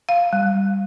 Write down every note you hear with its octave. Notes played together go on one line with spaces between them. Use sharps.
F5
G3